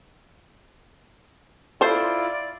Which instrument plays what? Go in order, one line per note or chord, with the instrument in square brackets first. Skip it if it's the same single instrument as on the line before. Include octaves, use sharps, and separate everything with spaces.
[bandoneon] E4 F4 [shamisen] A4 C5 [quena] D5